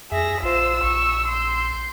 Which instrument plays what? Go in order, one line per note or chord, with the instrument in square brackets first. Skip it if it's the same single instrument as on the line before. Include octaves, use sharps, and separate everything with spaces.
[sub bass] F2 [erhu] G#4 [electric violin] E5 A#6
[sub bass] A#1 [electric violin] F4 C5 [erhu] E6
[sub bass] A#1 [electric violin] C#6
[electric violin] C6 G6